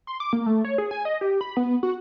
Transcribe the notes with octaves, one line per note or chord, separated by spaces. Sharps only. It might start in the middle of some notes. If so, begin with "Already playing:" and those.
C6
D6
A#3
A3
C#5
G#4
G#5
D#5
G4
B5
B3
F#4